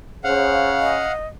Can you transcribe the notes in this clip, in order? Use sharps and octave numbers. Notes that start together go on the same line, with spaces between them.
C#3 C5 F5 F#5
D#5